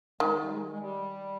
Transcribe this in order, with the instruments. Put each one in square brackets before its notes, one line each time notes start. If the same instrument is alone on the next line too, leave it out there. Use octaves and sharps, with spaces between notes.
[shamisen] D#3 [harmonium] G#3
[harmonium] G3
G#3
G#3
G3